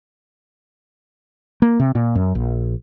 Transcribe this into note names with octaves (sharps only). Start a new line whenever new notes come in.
A#3
C3
A#2
F#2
A#1